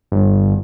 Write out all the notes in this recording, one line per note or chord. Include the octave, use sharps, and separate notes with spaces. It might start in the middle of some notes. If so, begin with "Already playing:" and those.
G1